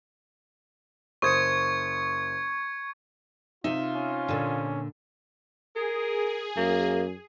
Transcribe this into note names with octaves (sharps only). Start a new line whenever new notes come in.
F#1 C5 C#6 D#6 G#6 C#7
C3 D#4 F4 E5
C#4
A#2 D3
G#4 A#4
F#2 A#3